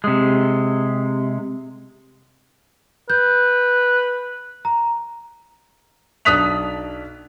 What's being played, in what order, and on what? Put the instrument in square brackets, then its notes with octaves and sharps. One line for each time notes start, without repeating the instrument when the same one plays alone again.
[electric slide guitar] C3 G#3
[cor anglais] B4 [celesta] G6
[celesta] A#5
[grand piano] B1 D4 D#6 F#6 B6 F7